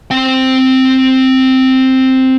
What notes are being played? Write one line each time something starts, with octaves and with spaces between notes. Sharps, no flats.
C4 G5